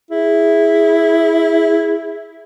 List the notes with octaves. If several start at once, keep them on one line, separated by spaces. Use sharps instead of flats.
E4 G#4